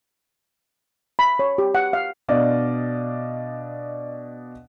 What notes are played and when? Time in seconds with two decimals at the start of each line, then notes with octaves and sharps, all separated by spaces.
1.19 B5
1.39 C#5
1.58 G4
1.75 F#5
1.93 F5
2.28 B2 D4 D5 D#5 F5